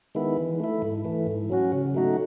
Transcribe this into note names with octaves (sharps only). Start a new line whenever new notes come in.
D#3 G#3 B3 E4
E3
A3 E4
G#2
E3 A3
G#2
F#3 C#4 F#4
C#3
F#3 A3 D#4 F#4